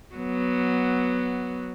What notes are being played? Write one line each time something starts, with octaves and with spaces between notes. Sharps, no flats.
F#3 B3